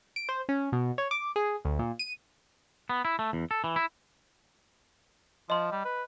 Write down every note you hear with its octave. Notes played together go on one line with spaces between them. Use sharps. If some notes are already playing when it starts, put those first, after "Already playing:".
D7
C5
C#4
B2
C#5
D6
G#4
D2
A#2
D#7
B3
E4
A3
E2
A4
E3
E4
F3 D#5 C6
G3
B4